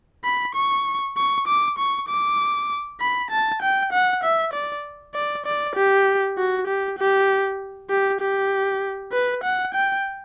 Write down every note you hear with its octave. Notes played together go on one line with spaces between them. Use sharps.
B5
C#6
C#6
D6
C#6
D6
B5
A5
G5
F#5
E5
D5
D5
D5
G4
F#4
G4
G4
G4
G4
B4
F#5
G5